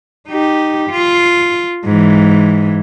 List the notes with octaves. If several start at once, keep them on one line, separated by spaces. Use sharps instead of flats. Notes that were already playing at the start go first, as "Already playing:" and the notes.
D#4 G4
F4
G#2 E3